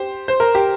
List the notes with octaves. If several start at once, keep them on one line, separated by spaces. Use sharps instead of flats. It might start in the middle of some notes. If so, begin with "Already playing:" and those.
Already playing: G4 C5
C5
A#4
G4